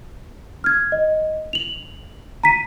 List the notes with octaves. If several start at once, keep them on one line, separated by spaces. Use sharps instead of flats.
F6 G#6
D#5
F7 F#7
A#5 B6 D#7